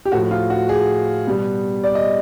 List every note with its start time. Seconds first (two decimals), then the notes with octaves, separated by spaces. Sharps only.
0.05 G4
0.12 A2 F3 A3 F#4
0.31 F4
0.50 F#4
0.69 G#4
1.27 B2 G3 B3
1.84 D5
1.95 D#5